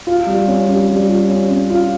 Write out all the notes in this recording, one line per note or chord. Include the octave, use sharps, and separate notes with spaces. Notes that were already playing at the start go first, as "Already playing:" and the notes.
F4
G3
C#4
G3
G3
F4
C#4
C#4
F4